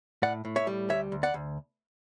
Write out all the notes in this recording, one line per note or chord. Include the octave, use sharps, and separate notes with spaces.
A2 D5 F#5
A2
C#5 E5
G3
D2 C#5 E5
D2
D5 F#5
D2